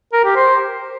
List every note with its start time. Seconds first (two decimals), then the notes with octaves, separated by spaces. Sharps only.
0.13 A#4
0.25 G4
0.36 C5